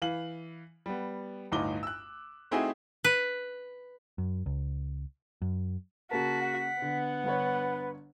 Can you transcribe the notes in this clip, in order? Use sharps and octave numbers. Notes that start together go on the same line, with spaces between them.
E3 F5 F#7
G3 B3
G1 D2 A2 D#4 D6 G7
E6 F#6
A3 C4 D#4 E4 F#4 G#4
B4
F#2
C#2
F#2
C#3 A#3 F#4 A#4 A5 B6
F#5
D3 B3
G1 D3 B4 C#5